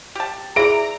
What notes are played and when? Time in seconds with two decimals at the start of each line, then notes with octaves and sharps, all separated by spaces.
0.15 G4 A5
0.56 E3 G#4 D5 E5 A#5 D7